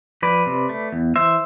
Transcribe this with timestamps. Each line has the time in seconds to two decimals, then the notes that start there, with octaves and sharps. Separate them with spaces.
0.22 F3 B4 D5
0.46 C3
0.69 A3
0.92 E2
1.16 E3 C5 E5